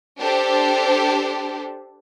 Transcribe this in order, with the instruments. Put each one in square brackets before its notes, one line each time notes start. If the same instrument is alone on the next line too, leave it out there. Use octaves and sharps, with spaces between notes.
[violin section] D4 G4 A4 C5